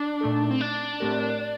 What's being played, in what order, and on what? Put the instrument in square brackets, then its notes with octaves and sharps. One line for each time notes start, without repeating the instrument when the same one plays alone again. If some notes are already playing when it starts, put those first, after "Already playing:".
Already playing: [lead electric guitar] D4
[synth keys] A#2 A3 D#4 A4
[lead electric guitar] C4
D4
[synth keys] A2 A3 C4 G4 A#4